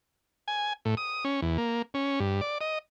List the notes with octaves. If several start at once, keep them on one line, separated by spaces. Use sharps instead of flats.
G#5
A2
D#6
C#4
E2
A#3
C#4
G2
D5
D#5